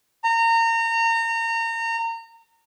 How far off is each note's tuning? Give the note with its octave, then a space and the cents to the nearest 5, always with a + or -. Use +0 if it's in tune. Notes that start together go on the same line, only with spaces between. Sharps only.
A#5 -30